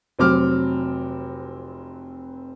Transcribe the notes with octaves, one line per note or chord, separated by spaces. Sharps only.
F1 F#3 C4 D6 F6